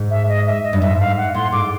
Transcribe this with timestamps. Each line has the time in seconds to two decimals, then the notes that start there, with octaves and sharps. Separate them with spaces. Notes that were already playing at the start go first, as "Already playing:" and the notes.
Already playing: G#2
0.11 E5
0.29 D#5
0.46 E5
0.64 D#5
0.73 G2
0.81 G#2 E5
1.00 F5
1.17 F#5
1.35 A2 C6
1.52 G#2 D6